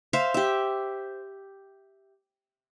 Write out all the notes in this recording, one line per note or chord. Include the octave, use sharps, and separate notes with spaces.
C5 E5 F5
G4 E5